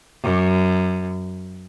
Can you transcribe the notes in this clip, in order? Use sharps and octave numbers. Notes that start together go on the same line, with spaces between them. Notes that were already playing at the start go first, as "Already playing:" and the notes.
F#2